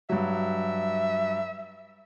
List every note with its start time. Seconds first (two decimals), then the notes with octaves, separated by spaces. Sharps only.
0.09 G2 F#3 E5